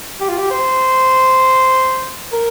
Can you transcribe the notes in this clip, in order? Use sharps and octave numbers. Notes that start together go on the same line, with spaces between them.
G4
F4
G4
C5
A#4